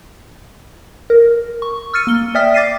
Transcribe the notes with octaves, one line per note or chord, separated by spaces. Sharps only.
A#4
C#6
E6 F6 A6 C#7 D#7
A#3 G7
D5 E5 G5 D#6 F6 B6
D6 A6 B6 C7 D#7